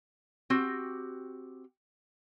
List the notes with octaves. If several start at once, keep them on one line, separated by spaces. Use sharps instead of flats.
C4 F#4 G4